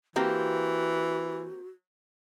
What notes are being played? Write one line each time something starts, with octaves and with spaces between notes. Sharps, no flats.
E3 A#3 C4 F#4 G4